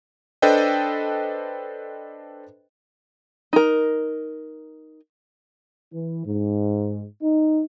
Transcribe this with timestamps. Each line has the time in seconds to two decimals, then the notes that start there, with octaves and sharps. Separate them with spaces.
0.42 D4 A4 B4 C5 D#5 G5
3.53 D#4 A#4
5.93 E3
6.26 G#2
7.22 D#4